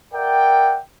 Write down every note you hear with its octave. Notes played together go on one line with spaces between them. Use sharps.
A#4 D5 E5 F#5 G5